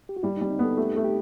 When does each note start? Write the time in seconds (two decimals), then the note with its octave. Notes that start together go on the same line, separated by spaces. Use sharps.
0.09 G4
0.17 F#4
0.23 G3 E4
0.37 D#4
0.41 G3
0.46 C4
0.51 D#4
0.59 B3 A4
0.77 A3 G4
0.96 A3
1.04 G4